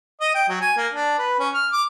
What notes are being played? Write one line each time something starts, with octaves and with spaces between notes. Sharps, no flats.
D#5
G5
F#3
G#5
A#3
D4
B4
C#4
F6
D6